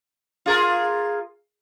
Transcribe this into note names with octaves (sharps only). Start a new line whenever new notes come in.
F4 G#4 A#4